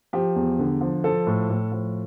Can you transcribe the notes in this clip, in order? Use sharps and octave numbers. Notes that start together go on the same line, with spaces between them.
F3 G4
E2
D3
F3
F3 A4
A2
A2
F3